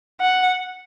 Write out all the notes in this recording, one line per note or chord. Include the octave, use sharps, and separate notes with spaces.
F#5